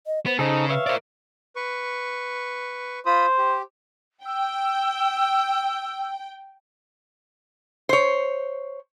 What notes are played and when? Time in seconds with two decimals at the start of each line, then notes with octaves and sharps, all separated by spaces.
0.06 D#5
0.26 B3 C5
0.39 C#3 D#4 G#4 A4 C5
0.69 B4 C#5 E5 F5
0.87 A#4 C5 D5
1.56 B4 C#6
3.06 F4 C5 B5 D#6
3.38 G4
4.25 G5 E6
7.89 C5 C#5